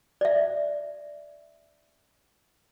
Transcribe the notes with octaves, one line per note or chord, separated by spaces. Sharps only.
D5 E5